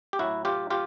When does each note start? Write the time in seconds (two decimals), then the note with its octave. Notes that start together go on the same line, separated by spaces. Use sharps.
0.13 G4
0.19 A2 F#3 E4 F#4
0.45 F4 G4
0.70 F4 G4